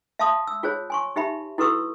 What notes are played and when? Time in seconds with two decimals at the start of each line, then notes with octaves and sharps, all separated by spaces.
0.19 E5 F5 A5 C6 D#6
0.47 E6
0.63 F4 G#4 C5 C#5
0.90 G#5 C6 C#6
1.16 D#4 G4 E5 B5
1.58 E4 F#4 A4 B4 C#6 E6